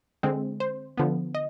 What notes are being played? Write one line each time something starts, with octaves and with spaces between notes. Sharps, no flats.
D3 G#3 C4
C5
D3 F3 B3
D#5